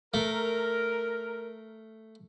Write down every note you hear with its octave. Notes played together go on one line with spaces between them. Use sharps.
A3 A#4